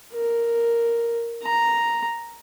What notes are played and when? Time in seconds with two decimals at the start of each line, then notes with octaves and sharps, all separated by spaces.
0.14 A#4
1.44 A#5